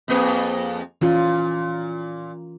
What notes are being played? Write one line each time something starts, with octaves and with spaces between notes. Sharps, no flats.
F2 A#3 G#4
A#2 E3 C#4 F4